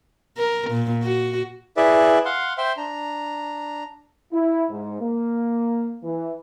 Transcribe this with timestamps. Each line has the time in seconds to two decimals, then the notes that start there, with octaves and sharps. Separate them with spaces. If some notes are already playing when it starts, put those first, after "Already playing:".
0.37 A#4
0.70 A#2
1.03 F#4
1.77 E4 G#4 B4 D5 E5
2.25 F5 F#5 C6
2.58 C5 E5 G5 C6
2.77 D4 A#5
4.33 E4
4.70 G#2
5.01 A#3
6.03 E3